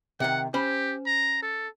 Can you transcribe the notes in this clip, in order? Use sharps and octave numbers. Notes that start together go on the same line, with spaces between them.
C3 D#3 F#5
C#4 G4 C5 B5
A#5
A4